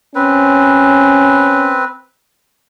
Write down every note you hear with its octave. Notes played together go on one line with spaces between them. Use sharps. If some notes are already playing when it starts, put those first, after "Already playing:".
C4 C#4 B4